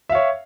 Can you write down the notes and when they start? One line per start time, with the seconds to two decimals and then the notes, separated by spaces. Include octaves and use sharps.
0.10 E5
0.12 F5
0.15 C#5